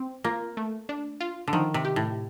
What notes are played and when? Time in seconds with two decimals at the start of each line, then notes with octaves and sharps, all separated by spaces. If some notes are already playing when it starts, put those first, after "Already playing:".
Already playing: C4
0.24 A#3 F4
0.57 A3
0.89 D4
1.21 F4
1.48 D3
1.53 D#3 F3
1.74 C3
1.85 G4
1.96 A2